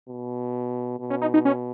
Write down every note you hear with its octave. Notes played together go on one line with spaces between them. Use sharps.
B2
B2
C#4
D#4
D#4
C#4